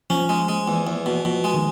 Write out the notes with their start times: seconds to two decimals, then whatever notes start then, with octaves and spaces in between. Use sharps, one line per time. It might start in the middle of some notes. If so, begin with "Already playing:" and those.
0.10 F3 C#4
0.29 G#3
0.49 G#3
0.68 E2
0.87 E2
1.06 B2
1.25 B2 F3
1.44 G#3
1.54 D#3